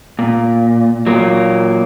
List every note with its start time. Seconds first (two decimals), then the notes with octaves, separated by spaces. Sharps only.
0.19 A#2
1.06 A#2 F#3 A#3